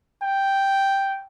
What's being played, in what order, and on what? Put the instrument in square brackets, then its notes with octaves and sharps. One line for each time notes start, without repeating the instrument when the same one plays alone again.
[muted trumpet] G5